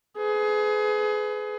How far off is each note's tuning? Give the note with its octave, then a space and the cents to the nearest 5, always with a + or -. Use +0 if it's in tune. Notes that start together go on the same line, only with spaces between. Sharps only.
G#4 +25 B4 +30